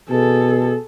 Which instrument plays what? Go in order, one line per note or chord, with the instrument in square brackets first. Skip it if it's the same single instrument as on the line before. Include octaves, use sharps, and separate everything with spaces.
[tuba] B2 [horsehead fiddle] G#4 A4